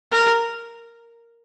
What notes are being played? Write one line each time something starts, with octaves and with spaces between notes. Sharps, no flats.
A#4